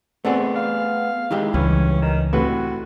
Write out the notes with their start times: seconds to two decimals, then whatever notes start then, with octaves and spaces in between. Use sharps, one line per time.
0.25 A3 B3 C4 G#4 D5 F#5
0.56 F5
1.31 D#3 G#3 E4 G4
1.54 C#2 G2 E3 C#4
2.02 D#3
2.33 A2 C3 F#4 B4